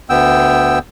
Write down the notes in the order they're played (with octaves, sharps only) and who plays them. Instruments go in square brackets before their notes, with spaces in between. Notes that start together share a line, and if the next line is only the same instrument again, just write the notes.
[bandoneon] D2 B3 G5 E6